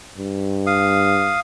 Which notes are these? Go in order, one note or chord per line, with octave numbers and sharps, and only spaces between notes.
G2
F5 D#6